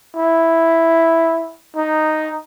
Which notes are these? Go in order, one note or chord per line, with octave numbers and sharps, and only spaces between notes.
E4
D#4